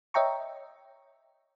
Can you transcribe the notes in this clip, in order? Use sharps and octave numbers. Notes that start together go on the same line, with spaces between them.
C#5 D#5 E5 G5 A#5 C#6